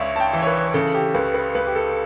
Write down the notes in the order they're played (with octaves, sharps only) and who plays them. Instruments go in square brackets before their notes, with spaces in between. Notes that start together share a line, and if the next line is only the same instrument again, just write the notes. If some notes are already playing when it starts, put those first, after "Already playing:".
Already playing: [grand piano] C#2 [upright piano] C#5 D5 E5
[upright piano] A5
G5
[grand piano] E3
[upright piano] C#5
B4
[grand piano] C#3 [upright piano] A4
[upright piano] G4
[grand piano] C#2 [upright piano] B4
[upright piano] B4
[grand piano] C#2 [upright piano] B4
[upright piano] G4
A4